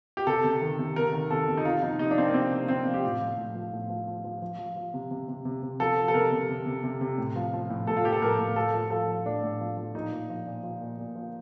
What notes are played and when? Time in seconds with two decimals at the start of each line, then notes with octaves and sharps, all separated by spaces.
0.17 G4
0.27 C3 A4
0.44 C3
0.62 D#3
0.79 C3
0.96 C3 A#4
1.13 D#3
1.31 C3 A4
1.48 C3
1.57 D#4
1.65 C3 F4
1.82 F3 D#4
1.99 C3 D#4
2.11 D4
2.18 F3 C4
2.26 A#3
2.34 C3 C4
2.52 C3
2.68 F3 C4
2.87 F3
2.94 G4
3.04 A2 F4
3.21 F3
3.38 A2
3.55 F3
3.73 A2
3.90 F3
4.07 F3
4.24 F3
4.42 F3
4.58 F3
4.76 F3
4.94 C3
5.11 C3
5.28 C3
5.45 C3
5.63 C3
5.80 F3 A4
5.97 F3
6.08 A4
6.14 C3 A#4
6.32 C3
6.49 C3
6.66 C3
6.83 C3
7.01 C3
7.18 A2
7.36 F3
7.53 F3
7.70 A2
7.87 A2 A4
7.97 F4
8.04 F3 G4
8.13 A4
8.22 A2 A#4
8.39 A2
8.56 F3 A4
8.74 F3
8.90 F3 A4
9.08 F3
9.26 A2 D4
9.43 A2
9.60 F3
9.77 F3
9.95 A#2 D#4
10.12 F3
10.30 F3
10.46 A#2
10.63 F3
10.81 A#2
10.98 A#2
11.15 F3